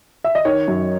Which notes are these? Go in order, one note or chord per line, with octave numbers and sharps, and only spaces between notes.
E5
D#5
D#3 C#5
F#2